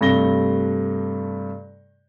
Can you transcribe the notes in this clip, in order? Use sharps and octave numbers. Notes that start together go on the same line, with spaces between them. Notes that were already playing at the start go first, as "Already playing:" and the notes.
G2 C3 A3 A#6 G7